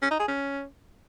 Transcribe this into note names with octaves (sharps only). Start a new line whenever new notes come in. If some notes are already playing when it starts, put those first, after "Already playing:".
C#4
D#4
G#4
C#4